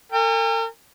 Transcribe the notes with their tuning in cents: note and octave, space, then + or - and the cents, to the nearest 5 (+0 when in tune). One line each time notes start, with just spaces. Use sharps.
A#4 -45 G#5 -45